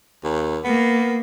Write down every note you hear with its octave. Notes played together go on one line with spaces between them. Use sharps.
D#2
A#3 B3